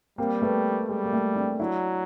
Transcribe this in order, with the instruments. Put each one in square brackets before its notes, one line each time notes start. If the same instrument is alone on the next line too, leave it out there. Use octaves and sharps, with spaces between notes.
[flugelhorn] G3 [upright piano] A#3 C4
[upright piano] A3 B3
[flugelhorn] G3 [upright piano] G#3
[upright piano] A#3
A3
C4 D4
[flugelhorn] F#3 [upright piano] D4 E4